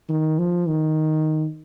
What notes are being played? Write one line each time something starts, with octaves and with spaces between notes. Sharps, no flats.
D#3
F3
D#3